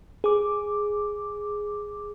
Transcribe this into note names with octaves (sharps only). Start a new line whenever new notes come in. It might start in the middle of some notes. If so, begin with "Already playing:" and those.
G#4 D6